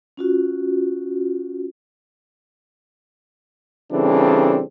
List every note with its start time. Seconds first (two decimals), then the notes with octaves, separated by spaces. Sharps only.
0.17 C#4 F4 F#4
3.92 C#3 E3 G3 C4 D4 A4